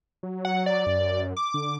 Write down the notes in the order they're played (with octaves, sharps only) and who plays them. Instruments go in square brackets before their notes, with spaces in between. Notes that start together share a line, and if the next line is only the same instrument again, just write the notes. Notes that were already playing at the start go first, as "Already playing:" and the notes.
[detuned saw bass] F#3
[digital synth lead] F#5
D5
[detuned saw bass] F#2
[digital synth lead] D6
[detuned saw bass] D3